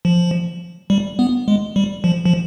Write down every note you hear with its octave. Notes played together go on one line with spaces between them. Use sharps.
F3
G3
B3
G#3
G3
F3
F3